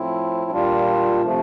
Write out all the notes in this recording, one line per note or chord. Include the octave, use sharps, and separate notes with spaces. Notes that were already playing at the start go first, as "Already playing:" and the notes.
Already playing: A2 F3 C4 E4
A#2 G3 D4 F4
C3 F3 A3